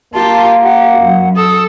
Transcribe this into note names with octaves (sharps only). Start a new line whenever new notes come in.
A#3 F4 G4 A5
G4 F#5
F#2
A4 D#6